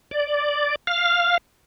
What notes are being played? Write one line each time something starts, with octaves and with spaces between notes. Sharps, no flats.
D5
F5